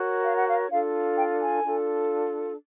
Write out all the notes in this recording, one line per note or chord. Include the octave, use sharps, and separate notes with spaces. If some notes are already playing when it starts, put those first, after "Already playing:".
Already playing: F#4 A#4 C#5
F5
F#5
F5
D4 F4 A4 F5
G5
G#5
D4 F4 A4